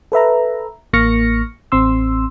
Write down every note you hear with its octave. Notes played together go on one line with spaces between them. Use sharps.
A4 B4 E5 A#5
A1 A#3 C#6 F6 A#6 C#7
A1 C4 C6 E6